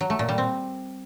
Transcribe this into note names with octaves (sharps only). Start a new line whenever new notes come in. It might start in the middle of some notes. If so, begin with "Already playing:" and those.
F#3
A3
A#2
G3
C4